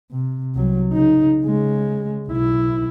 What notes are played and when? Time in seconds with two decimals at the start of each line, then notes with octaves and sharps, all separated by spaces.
0.11 C3
0.55 C2 F#3
0.93 C#3 D#4
1.44 C#3 G#3
2.28 B1 E4